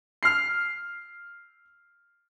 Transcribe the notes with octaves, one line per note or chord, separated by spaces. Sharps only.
F6 C7